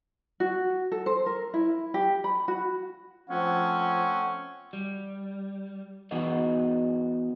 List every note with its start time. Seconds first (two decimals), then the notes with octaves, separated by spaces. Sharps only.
0.40 F#4
0.92 A4
1.06 C5
1.26 A#4
1.54 E4
1.94 G4
2.24 B5
2.48 F#4
3.30 F3 A3 C4 C#4 F#5
4.73 G3
6.11 E3 B3 D#4 F#4 G#4 D#5